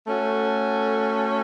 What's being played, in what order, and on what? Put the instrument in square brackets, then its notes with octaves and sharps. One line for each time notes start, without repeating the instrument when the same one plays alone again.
[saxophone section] A3 C#4 F#4 A4